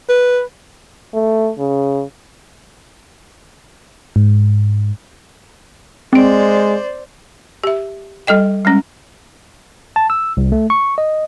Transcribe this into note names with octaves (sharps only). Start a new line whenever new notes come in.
B4
A3
C#3
G#2
G#3 C4 C5 D5 D7
G4 E5
G3 A4 D#5 G5
G3 G#3 C#4
A5
E6
C2
A3
C#6
D#5